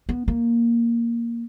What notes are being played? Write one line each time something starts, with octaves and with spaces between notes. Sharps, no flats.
B3
A#3